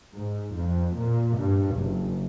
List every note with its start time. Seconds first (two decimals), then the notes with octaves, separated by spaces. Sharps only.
0.15 G#2
0.56 F2
0.98 A#2
1.39 G2
1.77 F#1